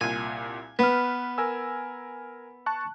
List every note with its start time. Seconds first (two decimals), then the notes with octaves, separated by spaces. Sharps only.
0.01 C2 A#2 G#5
0.79 B3 B4 F6
1.38 A#4 G#5 E6
2.66 A5 C#6 F#6